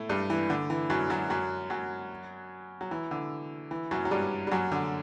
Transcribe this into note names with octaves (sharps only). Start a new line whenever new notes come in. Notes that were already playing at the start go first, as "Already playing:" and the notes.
Already playing: A2 A3
G2 G3
E3
D3
E3
F#2 F#3
F#2 F#3
F#2 F#3
F#2 F#3
F#3
E3
D3
E3
F#2 F#3
F#3
G2 G3
G3
F#2 F#3
D3